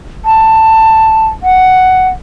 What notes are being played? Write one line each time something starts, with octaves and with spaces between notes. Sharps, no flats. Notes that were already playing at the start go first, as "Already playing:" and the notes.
A5
F#5